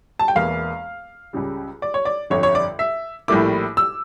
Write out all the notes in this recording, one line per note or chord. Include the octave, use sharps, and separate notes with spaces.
A5
G5
E1 E2 E3 A#3 F5
C#2 C#3 G3
D5
C#5
D5
G1 F2 D3 C#5
C#5
D5
E5
A#1 A2 G3 A#3 E4 D6
E6